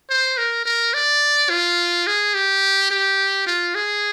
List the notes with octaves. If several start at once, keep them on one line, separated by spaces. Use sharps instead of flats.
C5
A#4
A#4
D5
F4
G#4
G4
G4
F4
G#4